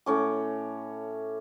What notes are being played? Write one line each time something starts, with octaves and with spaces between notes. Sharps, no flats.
A2 C#4 D6